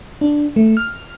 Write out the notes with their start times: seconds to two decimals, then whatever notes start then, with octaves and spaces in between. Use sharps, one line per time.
0.21 D4
0.56 A3
0.77 F6